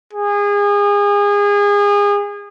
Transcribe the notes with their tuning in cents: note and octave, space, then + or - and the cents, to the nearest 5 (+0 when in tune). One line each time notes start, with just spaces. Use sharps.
G#4 -30